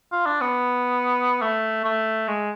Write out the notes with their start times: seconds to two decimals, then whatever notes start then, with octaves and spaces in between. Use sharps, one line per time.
0.12 F4
0.26 D4
0.41 B3
1.42 A3
1.85 A3
2.28 G#3